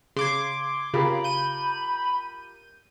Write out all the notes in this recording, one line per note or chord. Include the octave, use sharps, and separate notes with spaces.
C#3 C6 D6 G#6
C#3 F4 G4 A#4 B5
G6 D#7